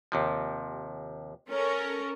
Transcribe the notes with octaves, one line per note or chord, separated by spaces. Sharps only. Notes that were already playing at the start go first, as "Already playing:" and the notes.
D#2 C3 F3
C#4 A4 A#4